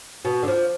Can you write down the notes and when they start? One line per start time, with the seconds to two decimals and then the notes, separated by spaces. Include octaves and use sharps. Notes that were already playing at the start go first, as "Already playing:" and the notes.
0.25 B2
0.43 D3
0.48 F3